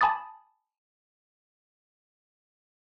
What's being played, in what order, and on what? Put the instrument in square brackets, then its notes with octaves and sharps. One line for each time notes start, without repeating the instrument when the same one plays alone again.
[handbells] G#5 A5 B5 D6 D#6 A6